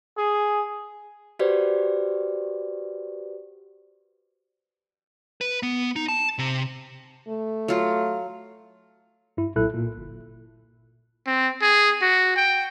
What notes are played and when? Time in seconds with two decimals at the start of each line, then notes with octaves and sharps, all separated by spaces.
0.18 G#4
1.39 F#4 G4 B4 C5 D5
5.41 B4
5.63 B3
5.96 D#4
6.08 A5
6.38 C3
7.28 A3
7.68 F#3 F4
9.37 G2 E4
9.56 B1 A#2 E4 A4 F#6
9.74 A#2
9.98 G1
11.27 C4
11.62 G#4
12.02 F#4
12.36 G5